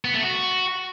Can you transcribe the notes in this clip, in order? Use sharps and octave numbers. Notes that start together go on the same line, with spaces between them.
B3
A3
F#4